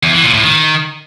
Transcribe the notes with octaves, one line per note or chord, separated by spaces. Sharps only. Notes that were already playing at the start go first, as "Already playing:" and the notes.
E2
E3
A#2
A2
D#3